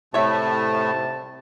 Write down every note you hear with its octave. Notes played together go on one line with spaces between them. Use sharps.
A2 C3 A3 C#5 E5 A5